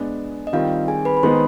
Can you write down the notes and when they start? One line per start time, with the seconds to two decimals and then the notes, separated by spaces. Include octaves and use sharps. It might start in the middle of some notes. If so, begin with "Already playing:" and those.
Already playing: G#3 B3 D4
0.47 D#5
0.53 D#3 G3 C4 F4 F5
0.88 G#4 G#5
1.05 B4 B5
1.17 B5
1.23 D#3 G#3 B3 D#4 C5 C6